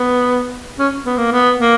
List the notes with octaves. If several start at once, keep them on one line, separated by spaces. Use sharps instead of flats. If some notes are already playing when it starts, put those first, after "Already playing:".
Already playing: B3
C#4
B3
A#3
B3
A#3